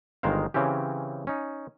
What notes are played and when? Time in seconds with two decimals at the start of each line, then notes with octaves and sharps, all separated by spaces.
0.23 G1 D#3 G#3 A#4 C5 F5
0.54 C#3 E3 C4 C#4 G4
1.27 C#4 D#4